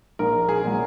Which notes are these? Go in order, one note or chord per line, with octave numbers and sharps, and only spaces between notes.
A#1 A#4
G#4
A#2 F#3